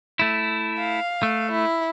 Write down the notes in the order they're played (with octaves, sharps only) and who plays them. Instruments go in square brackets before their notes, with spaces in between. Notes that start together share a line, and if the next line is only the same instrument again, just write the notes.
[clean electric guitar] A3 E4
[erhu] F5
[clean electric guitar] A3
[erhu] E4